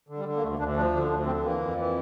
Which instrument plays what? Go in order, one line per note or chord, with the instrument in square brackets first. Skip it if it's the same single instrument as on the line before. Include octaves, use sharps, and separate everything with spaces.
[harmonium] D3
G3
D3
A#3
D2 A3
D2 D4
F3 D4
D3 D4
D2 D4
D3 C4
E3 A#3
F2
E3